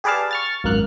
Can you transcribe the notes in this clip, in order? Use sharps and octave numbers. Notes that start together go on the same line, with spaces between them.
G4 G#4 B4 D5 F5 A5
C#6 F6 A6
G#1 F#2 A#3 F6 F#6